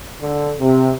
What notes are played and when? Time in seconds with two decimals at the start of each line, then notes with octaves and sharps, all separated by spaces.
0.21 D3
0.60 C3